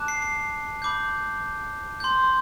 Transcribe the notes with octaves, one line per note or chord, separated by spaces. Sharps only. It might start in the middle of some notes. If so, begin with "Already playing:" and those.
Already playing: A5 D6 F#6
C7
C7
B5 D6 G6
C6 G6